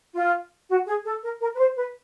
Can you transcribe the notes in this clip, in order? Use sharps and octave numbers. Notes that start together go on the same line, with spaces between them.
F4
F#4
G#4
A4
A#4
A#4
B4
C5
B4